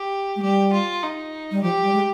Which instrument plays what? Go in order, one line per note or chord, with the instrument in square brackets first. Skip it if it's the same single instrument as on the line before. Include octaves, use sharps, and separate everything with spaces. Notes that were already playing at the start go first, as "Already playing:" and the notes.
Already playing: [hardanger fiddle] G4
[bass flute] G#3
[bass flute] G3 [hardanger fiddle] G4
[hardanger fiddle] F4
D#4
[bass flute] G3
[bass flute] F3 [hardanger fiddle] G4
[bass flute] G3
G#3